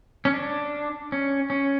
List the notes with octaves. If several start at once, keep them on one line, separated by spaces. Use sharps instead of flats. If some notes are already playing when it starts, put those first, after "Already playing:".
C#4
D4
C#4
C#4